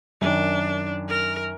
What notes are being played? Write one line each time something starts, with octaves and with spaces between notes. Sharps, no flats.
F#2 D#3 D4
A#4